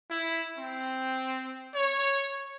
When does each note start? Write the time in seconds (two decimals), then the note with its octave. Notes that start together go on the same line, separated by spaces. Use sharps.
0.11 E4
0.59 C4
1.75 C#5